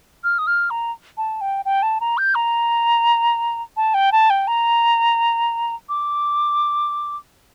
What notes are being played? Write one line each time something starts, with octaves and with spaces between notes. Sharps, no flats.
F6
D#6
F6
A#5
A5
G5
G5
A5
A#5
G6
A#5
A5
G5
A5
G5
A#5
D6